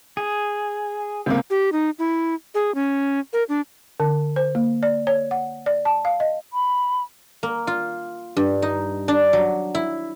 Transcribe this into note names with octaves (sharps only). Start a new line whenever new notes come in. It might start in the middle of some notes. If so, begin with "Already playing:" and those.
G#4
C#2 C3 A#3
G4
D#4
E4
G#4
C#4
A#4
D4
D3
C5
A#3
D5
C#5
F#5
D5
A5
F5
D#5
B5
A#3
F4
G2
D#4
D4
F#3
E4